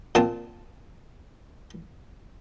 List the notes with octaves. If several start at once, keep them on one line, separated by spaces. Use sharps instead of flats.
A#2 C4 A5